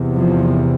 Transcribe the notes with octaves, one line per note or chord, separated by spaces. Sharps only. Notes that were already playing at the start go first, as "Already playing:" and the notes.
Already playing: E2 C3
F3